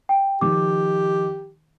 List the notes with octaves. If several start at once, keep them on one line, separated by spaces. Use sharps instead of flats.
G5
D#3 F3 G4 D6